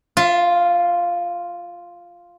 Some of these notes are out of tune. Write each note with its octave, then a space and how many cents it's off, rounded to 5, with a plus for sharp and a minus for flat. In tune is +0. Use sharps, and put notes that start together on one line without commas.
F4 +0 E5 +45